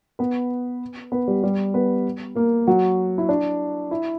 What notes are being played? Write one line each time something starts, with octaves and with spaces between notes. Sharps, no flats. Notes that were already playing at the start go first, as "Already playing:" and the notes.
B3 B4
B3 B4
G3 G4
G3 G4
B3 B4
A#3 A#4
F#3 F#4
E4
D4
E4